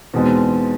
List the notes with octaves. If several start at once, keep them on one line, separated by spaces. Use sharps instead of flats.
E2 B2 G#3 C4 D#4